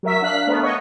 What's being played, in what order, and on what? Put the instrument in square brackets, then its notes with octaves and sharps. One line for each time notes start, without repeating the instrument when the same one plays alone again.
[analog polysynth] F#3 A#4 E5 B6
D4 F5 F#6 B6
A3 B3 A#4
C#5 D#5 F#5 C#6